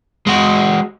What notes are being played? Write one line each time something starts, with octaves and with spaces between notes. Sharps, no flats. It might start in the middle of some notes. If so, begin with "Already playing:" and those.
G#3 F#4